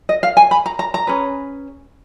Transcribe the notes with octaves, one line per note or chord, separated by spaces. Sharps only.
D#5
F5
G#5
B5
A#5
A#5
A#5
C#4 G#4 B4